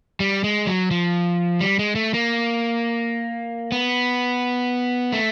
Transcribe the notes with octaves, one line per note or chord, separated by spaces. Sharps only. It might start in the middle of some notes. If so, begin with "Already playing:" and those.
G3
G#3
F#3
F3
G3
G#3
A3
A#3
B3
A3